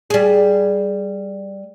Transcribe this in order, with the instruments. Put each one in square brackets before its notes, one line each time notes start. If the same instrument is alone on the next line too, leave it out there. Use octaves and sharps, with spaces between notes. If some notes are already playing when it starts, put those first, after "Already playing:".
[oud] G3 G#4